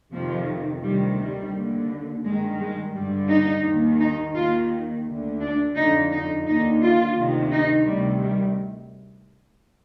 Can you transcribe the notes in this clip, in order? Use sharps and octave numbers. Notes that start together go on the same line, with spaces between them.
F2 C3 D#3 F3
D2 C3 D#3 G3
G3
D#2 D3
G2 D#3 G#3
G#3
G2 D3 G3
D#4
D#2 D#3
D#4
D#2 D#3 F4
D2 D3
D4
F2 D3 D#4
D#4
D#2 D3 D#4
F4
D2 C3 D#3
D#4
D2 C3 D#3 G3
G3